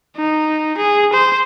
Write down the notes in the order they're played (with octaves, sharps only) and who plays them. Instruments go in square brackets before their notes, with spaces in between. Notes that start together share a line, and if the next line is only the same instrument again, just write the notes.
[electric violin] D#4
G#4
C5